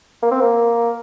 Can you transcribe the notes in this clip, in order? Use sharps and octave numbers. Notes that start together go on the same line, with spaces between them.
A#3
C4
A#3